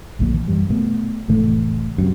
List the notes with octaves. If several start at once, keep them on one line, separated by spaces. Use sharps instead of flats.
D1 A#1 F2 A#3
E3
F#2 G3
B2 A3 B3
F1 A2 E3 A3
F#2 C3